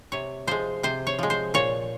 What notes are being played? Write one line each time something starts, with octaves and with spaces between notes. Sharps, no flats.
C3 C#5
F3 G#3 C5
C3 C5
C#5
F3 G#3
C5
A#2 C#5